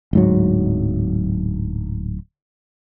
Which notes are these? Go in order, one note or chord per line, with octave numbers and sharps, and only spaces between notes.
D1 G#2 F#3